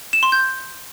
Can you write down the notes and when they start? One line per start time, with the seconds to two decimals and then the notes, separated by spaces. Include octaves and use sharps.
0.13 E7
0.23 C6
0.32 G6